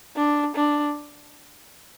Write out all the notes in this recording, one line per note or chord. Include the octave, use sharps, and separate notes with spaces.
D4
D4